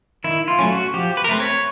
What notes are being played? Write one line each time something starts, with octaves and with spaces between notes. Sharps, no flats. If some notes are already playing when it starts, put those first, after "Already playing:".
D#3 E4
F4
F#3 A3 C#4
F#4
F3 G4
B4
A#4
A3 C4 B4
C#5